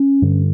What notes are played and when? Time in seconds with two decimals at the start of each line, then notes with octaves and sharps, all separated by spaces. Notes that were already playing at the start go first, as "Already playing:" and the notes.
Already playing: C#4
0.22 G2 D3